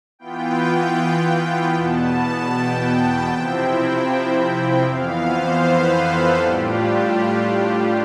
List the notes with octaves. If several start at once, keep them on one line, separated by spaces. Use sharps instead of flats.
E3 B3 F4 G5
E2 B2 B3 A5
G5
C3 F3 C4 E4
F2 E3 B3 F5
C5
B4
A4
A2 G3 D4 F4 G4